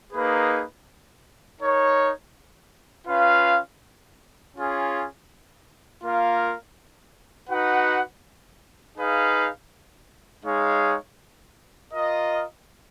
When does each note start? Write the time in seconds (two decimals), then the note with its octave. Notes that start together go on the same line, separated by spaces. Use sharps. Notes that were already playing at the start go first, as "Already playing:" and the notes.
0.12 A#3 D#4 G#4 B4
1.60 D#4 A#4 C#5
3.07 C#4 F4 B4 F5
4.55 C#4 F4 G#4
6.03 A#3 F4 A#4 F5
7.49 D#4 F#4 B4 F#5
8.97 D#4 G#4 B4 F5
10.44 G#3 D#4 G#4 C#5 F5
11.92 F4 A#4 D#5